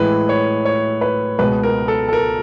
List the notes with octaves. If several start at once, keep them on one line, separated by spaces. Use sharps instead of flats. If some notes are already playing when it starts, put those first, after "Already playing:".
Already playing: A2 E3 G#3 B4
C#5
C#5
B4
C#2 B2 G#3 B4
A#4
A4
A4
A#4